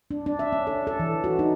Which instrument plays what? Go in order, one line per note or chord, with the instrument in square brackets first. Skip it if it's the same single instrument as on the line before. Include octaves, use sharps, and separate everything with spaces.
[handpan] D4
D4
E5
C#4
A4
A4
E3
F#4
D#4